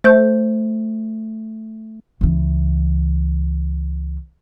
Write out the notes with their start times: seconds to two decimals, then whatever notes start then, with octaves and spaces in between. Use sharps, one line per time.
0.04 A3 C5 G6
2.21 C#2 E3